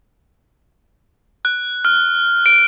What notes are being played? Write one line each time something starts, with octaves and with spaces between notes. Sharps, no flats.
F#6
F6
D7